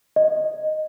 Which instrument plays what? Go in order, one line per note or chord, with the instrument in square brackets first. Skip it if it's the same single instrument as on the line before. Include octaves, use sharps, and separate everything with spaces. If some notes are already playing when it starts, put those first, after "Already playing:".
[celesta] D#5